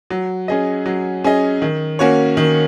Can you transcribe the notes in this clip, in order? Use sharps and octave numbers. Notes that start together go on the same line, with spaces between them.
F#3
C#4 G#4 D#5
F#3
C#4 G#4 D#5
D#3
A#3 C#4 F#4 C#5
D#3